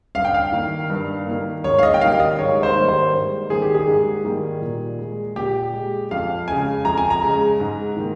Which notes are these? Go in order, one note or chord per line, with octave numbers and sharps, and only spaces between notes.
G2 F5
G5
F5
D#3 A#3
G2
D#3 A#3
G#2 C#5
F5
D#5
G5
D#3 G3 A#3 F5
D#5
G#2 C#5
C5
D#3 G3 A#3
C5
G#2
D#3 G3 A#3 G#4
G4
G#4
G#2
D#3 G3 A#3
A#2
G#3
A#2 G4
G#3
F2 F5
C#3 G#3 G#5
F2 A#5
G#5
A#5
C#3 G#3
G#2
D#3 A#3